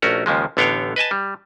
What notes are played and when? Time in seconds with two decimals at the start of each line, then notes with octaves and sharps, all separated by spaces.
0.02 A#1 A3 C#4 F#4 A#4
0.26 D#2 C#3 F3 G#3
0.57 A1 D3 B3 C#5 F5 G5
0.96 B4 D#5 G#5 A5
1.11 G3